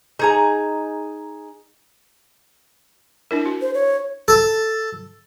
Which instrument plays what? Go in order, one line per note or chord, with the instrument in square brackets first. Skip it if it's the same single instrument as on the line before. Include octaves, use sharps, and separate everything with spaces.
[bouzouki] D#4 G#4 A#5
[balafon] D4 E4 A#4
F#4
[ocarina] C5
C#5
[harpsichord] A4